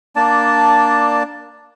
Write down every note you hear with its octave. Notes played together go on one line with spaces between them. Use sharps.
A#3 D4 D5 A5